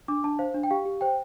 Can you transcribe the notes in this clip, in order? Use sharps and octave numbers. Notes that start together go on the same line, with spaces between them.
D4 D6
D4 A5
C5 F5
D4
G5
G4 F5
G4
C5 G5